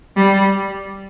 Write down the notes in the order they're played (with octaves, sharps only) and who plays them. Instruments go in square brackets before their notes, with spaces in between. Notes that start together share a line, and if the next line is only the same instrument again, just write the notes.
[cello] G3